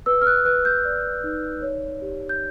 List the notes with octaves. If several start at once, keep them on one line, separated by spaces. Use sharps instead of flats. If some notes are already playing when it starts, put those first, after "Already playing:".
B4 E6
F6
F#6
B4 F#6
G6
D5
D#4
C#5
G4
G6